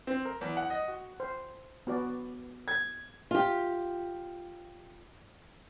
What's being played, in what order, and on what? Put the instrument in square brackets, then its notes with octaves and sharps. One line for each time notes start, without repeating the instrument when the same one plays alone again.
[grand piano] C4
A#4
E2
F#5
D#5
F#4
[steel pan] C5
B3 F#4 D5
[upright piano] G#6
[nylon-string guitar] F4 G4